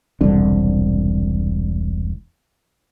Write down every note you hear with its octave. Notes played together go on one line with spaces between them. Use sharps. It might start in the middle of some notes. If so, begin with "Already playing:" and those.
E1 C2 D3